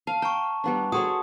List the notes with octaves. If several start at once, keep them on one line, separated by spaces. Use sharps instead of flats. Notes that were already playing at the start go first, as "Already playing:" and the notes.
F5 A5
G5 A#5 C#6
G3 B3 D4
F#4 G#4 A4 C#5 C6 D#6